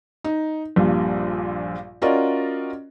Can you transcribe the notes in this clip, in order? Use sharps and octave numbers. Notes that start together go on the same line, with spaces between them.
D#4
A#1 G2 A#2
C#4 F4 F#4 A#4 D5 D#5